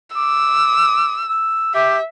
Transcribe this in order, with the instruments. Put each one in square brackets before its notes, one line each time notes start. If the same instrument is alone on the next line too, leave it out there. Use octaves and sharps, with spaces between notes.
[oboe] D6 [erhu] E6
[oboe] E6
[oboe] G4 [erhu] E5